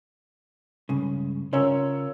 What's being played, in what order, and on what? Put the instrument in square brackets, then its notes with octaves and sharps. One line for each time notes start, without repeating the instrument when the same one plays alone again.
[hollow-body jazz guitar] C#2 G2 C#3
[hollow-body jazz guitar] C#3 C#4 A#4 [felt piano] F4 C#5 E6